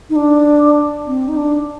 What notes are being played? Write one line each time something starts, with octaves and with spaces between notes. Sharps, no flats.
D#4
D4
C4
D#4
D4